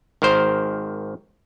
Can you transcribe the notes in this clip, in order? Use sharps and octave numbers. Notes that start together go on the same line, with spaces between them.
G#1 D#3 A#4 C5